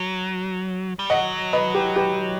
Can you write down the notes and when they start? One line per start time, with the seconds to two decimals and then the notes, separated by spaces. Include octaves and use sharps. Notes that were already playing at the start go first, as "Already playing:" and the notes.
Already playing: F#3
0.99 G3
1.10 F#3 D#5 F#5
1.53 B4 D#5
1.75 G4 B4
1.95 G4 B4